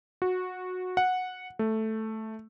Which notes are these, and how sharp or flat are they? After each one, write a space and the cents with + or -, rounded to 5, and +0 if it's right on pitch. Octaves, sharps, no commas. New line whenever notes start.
F#4 -15
F#5 -10
A3 +0